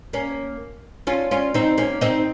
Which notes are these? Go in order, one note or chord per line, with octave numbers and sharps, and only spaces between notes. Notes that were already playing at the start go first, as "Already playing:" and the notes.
A#3 C#4
C#4 F4
C#4 F4
C4 D#4
A#3 C#4
C4 D#4